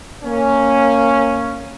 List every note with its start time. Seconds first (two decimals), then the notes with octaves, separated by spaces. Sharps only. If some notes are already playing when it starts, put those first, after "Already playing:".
0.23 A#3 C#4